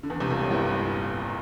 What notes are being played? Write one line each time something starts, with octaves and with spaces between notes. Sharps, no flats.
D3
E2 E3
C2 C3
A#1 A#2
A1 A2
G1 G2